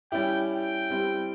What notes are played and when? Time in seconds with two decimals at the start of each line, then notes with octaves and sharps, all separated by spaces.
0.12 G3 C#4 E4 G4 G5
0.52 G5
0.90 G3 C4 E4